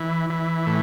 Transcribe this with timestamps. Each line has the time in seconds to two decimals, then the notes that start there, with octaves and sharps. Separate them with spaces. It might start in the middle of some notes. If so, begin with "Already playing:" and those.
Already playing: E3
0.30 E3
0.67 A2